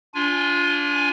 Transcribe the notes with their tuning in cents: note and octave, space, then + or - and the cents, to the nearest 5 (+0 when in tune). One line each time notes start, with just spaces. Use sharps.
D4 -30 F4 +0 G#5 +0